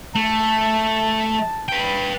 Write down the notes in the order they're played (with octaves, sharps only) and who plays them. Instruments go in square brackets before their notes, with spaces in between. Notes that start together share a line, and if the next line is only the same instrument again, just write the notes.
[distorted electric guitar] A3 [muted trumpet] A5
[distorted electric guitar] B4 G5